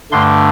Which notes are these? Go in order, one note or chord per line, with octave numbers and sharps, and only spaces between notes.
G2 D3 A3 D4 C6